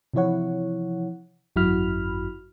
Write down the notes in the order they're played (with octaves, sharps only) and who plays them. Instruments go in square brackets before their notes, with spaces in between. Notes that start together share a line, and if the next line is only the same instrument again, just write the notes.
[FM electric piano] C3 E3 F3 E4 C#5 F#5
G#1 F#2 E4 F#4 B5 F6